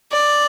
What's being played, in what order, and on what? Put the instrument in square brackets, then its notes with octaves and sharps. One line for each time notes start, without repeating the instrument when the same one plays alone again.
[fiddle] D5